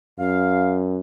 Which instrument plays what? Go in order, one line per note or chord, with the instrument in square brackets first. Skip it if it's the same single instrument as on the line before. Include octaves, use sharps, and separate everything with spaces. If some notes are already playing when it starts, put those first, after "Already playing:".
[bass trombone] F#2 [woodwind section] F5